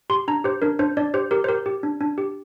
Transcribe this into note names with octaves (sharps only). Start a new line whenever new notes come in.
G4 C6
D4 A#5
G4 C5
D4 A#4
D4 C5
D4 D5
G4 C5
G4 A#4
C5
G4 A#4
G4
D4
D4
G4